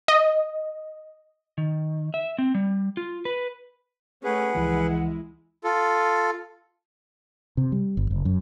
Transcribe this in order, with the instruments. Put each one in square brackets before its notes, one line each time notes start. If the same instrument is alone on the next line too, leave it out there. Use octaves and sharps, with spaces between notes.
[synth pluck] D#5
[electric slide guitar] D#3
E5
C4
G3
F4
B4
[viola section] A3 C#4 [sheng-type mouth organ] G#4 B4 [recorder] F#5
[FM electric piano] C#2 E3 F3 [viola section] G#3 E4
[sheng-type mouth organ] F4 A4
[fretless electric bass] C3
G3
G1
F#1
F#2